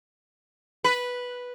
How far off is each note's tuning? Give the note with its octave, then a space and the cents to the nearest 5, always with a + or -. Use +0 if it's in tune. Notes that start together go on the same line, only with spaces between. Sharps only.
B4 -5